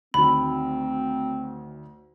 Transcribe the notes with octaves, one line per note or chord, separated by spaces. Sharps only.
D2 D#3 F#3 C4 B5